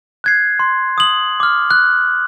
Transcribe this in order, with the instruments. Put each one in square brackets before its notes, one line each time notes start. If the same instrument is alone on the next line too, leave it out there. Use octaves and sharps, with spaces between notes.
[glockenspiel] F#6 G#6 C7
C6
D#6 F#7
D6 F6
F#6